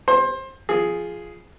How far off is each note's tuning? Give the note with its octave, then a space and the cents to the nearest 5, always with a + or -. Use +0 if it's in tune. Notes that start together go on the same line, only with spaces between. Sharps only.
C5 +25 C6 +20
F3 +0 G#4 +0